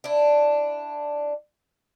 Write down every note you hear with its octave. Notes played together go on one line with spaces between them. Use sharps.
D4 E4